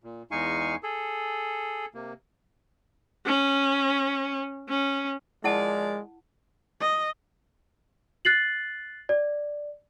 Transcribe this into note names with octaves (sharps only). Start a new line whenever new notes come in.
A#2
E2 G#3 D#4 F5 G#5 C#6
G#4 A4
C3 A#3
C#4
C#4
F3 G#3 E4 A#4 D5 F#5 A5
D#5
F#6 A6 C7 F#7
D5